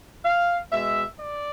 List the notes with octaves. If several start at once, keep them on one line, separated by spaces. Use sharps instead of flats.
F5
B2 G#3 E5
D5